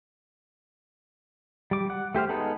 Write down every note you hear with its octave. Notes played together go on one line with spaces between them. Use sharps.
G3 D6
F#5
A3 G4 C5 F6
G#3 B3 D#4 A4 B4